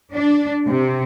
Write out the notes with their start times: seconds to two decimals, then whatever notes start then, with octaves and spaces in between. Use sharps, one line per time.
0.14 D4
0.66 C3